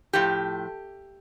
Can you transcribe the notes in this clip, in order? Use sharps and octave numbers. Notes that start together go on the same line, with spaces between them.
A2 F3 G4